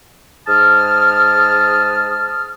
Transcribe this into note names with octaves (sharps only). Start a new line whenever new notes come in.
G#2 A5 D#6 F6